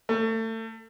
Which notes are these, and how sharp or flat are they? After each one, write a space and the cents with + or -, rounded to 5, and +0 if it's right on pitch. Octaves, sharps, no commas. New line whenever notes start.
A3 +30